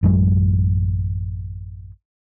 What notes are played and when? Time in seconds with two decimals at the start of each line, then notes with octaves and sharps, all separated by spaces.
0.03 A1 F#2 F#3 G#3